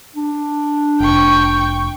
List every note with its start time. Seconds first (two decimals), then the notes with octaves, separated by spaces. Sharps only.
0.16 D4
1.00 F1 G5 C#6